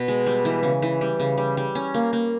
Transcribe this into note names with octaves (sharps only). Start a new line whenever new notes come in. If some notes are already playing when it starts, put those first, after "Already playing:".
Already playing: B2
G#3
G3
E3
C#3
E3
G3
C#3
G3
G3
C#4
A#3
A#3